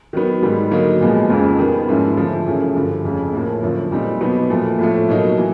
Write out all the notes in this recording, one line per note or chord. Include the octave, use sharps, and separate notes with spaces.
D#3 F#3 B3
G#2 D#3 G3
D3 F#3 A#3 D#4
A#2 F3 G#3 B3
F2 C#3 F3 G#3 C4
D#3 G3 B3
G#2 F3 A#3 C#4 E4
D3 F3 A3
F#2 C#3 E3 A3
G2 D3 F3
F2 C#3 F3 A3 C#4
A2 F3 A#3
F#2 D3 F3
A#2 G3 C4 D#4
B2 F#3 B3 D#4
A#2 F3 A3
A2 F3 A3
B2 F#3 A#3 D#4
E3